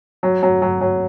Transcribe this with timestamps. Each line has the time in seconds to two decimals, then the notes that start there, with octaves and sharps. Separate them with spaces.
0.23 F#3
0.43 F#3
0.62 F#3
0.81 F#3